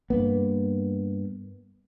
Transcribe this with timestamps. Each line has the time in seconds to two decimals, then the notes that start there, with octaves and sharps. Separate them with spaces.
0.10 G2 A#3 B3